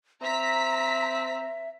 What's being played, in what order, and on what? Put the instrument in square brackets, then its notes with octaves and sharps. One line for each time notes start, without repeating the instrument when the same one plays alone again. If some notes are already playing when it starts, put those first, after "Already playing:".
[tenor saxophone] C4 [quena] E5 [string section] A#5 B6